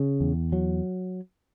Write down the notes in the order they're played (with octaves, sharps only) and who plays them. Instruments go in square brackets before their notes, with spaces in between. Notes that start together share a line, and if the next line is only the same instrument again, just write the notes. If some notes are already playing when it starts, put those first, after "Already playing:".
Already playing: [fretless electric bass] C#3
E2
F#3